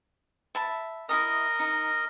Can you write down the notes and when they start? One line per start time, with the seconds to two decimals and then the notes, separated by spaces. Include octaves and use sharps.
0.55 E5 A5 B5
1.09 E4 A4 A#4 D#5 D#6
1.59 D#4